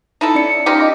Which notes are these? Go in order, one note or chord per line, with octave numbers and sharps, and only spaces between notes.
D#4 E4 A4
C#4 D5 C#7
D#4 F4 G4
D#5 D6 A#6